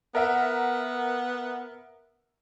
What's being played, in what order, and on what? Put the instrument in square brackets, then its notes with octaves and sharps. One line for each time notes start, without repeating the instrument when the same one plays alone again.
[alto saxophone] B3 [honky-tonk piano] A#4 E5 F#5